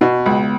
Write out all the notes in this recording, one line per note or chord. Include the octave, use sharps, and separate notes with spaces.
B2 B3
C#2